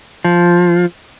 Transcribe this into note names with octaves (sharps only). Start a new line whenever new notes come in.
F3